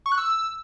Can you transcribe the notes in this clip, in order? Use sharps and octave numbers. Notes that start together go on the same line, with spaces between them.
C#6
F#6
E6